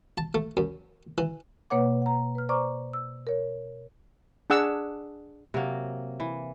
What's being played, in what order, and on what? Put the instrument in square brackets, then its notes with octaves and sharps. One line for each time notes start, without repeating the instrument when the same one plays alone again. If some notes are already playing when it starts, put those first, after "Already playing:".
[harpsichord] A5
A3
F#2
E3
[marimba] B2 A#3 B4 C#5 F#5 D6
F#5 A#5
B4 F6
C5 D5 A#5 C#6 D6 F6
E6
A#4 C#5
[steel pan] D4 G#4 F#5 E6
[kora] C3 F#3 A#3
E3